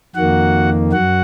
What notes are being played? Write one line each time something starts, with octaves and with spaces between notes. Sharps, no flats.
F2 D#3 A#3 F#4 F#5
F#2 F#4 F#5